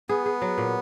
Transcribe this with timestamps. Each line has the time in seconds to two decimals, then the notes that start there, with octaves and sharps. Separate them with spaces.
0.09 B3 G#4
0.26 G#4
0.42 F#3
0.58 A#2